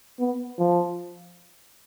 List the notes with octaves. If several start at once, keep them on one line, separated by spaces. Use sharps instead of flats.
B3
F3